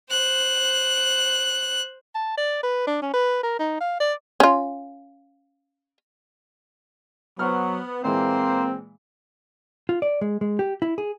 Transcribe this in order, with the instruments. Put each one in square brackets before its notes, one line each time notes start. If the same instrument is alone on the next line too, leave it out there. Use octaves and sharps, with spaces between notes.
[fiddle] C5 F#6
[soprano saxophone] A5
D5
B4
D4
C#4
B4
A#4
D#4
F5
D5
[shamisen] C#4 F4
[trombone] F#3 [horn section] B3 [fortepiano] C5 F#5 F6
[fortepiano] A#2 E3 G#3 [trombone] A#3 [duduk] C4 [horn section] C5
[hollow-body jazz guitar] F4
D5
G#3
G#3
G4
E4
G#4